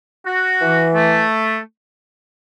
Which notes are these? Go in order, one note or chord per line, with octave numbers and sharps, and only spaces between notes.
F#4
E3
A3